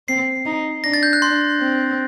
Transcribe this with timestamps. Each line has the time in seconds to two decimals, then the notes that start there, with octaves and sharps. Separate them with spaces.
0.08 C4 C7
0.46 D#4
0.84 D4 A#6
0.93 A6
1.03 G6
1.13 F#6
1.22 D4 C6
1.60 C4